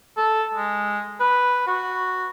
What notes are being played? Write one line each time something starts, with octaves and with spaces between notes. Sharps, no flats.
A4
G#3
B4
F#4